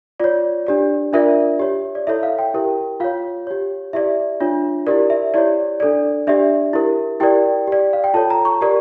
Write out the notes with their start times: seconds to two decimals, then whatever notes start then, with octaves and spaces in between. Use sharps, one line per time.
0.20 F4 C#5 D5
0.67 D4 G4 D5
1.13 D4 F4 A#4 D5 E5
1.59 G4 C#5
1.95 D5
2.07 E4 A4 C#5 E5
2.23 F5
2.38 G5
2.54 E4 G4 A#4
3.00 F4 C#5 F5
3.47 G4 C#5
3.93 E4 G4 D5 E5
4.40 D4 F4 C#5
4.87 E4 G4 A#4 D5
5.10 E5
5.34 E4 G4 C#5 D5
5.80 D4 A4 D5
6.27 D4 G4 D5 E5
6.73 E4 G4 A#4
7.20 E4 G4 A#4 D5 G5
7.67 G4 D5
7.93 F5
8.04 G5
8.14 F4 A4 C#5 A5
8.30 A#5
8.45 C#6
8.61 G4 A#4 D5